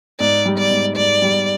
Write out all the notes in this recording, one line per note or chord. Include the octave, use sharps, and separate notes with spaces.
G#2 D5
G3
D5
G#2
G#2 D5
G3